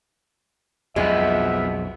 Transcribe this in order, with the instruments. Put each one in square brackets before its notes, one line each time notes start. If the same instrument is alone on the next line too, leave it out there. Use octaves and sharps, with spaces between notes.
[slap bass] B1 F2 [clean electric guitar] B2 F3 B3 [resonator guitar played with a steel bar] G#3 [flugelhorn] E5